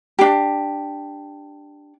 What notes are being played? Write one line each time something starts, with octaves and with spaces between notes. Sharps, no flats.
D4 G4